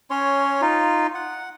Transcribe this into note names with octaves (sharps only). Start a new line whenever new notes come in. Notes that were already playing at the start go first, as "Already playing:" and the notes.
C#4 C#5 C6
D#4 F4
F#5